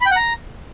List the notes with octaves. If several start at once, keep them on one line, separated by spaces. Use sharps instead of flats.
B5
G5
F#5
A#5